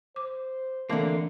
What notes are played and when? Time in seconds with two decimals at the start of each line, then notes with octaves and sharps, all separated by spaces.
0.16 C5 D6
0.90 D3 E3 A3 A#3 C4